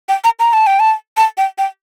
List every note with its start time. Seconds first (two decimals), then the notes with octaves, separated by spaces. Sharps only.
0.09 G5
0.24 A#5
0.39 A#5
0.53 A5
0.67 G5
0.80 A5
1.17 A5
1.37 G5
1.58 G5